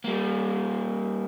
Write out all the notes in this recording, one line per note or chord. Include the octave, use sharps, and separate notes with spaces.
G3 A#3